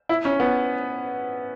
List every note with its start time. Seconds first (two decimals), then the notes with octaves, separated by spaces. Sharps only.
0.09 E4
0.25 C#4
0.40 B3